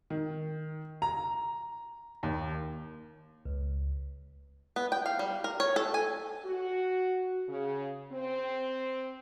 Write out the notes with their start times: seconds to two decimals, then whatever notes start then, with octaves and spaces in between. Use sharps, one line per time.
0.10 D#3
1.02 A#5
2.23 D#2
3.45 C#2
4.76 B3
4.92 G5
5.06 F5
5.19 G3
5.44 A#4
5.60 C#5
5.76 A4
5.94 G#5
6.45 F#4
7.49 C#3
8.12 C4